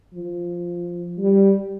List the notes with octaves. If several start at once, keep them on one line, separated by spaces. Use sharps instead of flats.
F3
G3